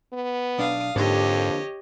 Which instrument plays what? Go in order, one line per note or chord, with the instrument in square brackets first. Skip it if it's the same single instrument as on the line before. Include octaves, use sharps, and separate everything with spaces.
[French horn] B3
[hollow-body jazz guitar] B1 D4 [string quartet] F5 D#6
[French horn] F2 [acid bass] G#2 [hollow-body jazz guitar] D3 A#3 A4 [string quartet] G4 C#5 D#5